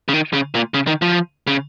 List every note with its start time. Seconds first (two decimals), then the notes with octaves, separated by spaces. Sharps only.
0.09 C#3
0.14 D#3
0.33 C#3
0.55 A#2
0.74 C#3
0.87 D#3
1.02 F3
1.47 C#3